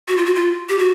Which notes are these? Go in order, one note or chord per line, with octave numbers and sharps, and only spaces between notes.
F#4
F4
F#4
F4
G4
F#4